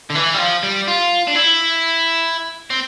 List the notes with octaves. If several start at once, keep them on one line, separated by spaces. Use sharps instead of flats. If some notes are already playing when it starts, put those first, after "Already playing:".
D3
E3
G3
F3
G3
F4
D4
E4
C4